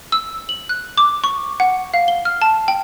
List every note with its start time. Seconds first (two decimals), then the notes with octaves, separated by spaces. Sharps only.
0.12 E6
0.49 F#7
0.69 F#6
0.98 D6
1.24 C#6
1.60 F#5
1.94 F5
2.08 G7
2.25 F6
2.42 A5
2.68 G5